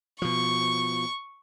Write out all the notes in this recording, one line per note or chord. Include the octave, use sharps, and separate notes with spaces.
B2 F3 C#6